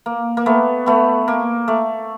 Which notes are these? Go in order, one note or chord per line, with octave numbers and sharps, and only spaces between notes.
A#3
A#3
A3 B3
A3 B3
A#3
A3